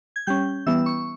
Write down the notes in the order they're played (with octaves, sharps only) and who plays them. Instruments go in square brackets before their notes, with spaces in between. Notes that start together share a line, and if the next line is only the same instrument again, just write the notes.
[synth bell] G#6
G3 C#4 G6
E3 G3 B3 E6
C#6